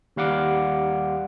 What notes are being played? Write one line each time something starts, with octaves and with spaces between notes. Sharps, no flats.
D#2 G3 F5 F#5 D6